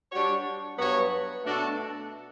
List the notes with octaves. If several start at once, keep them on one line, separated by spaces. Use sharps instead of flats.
G3 D4 F#4 C#5
G2 F#3 B3 F#4 C#5
B2 A3 D4 F#4 A4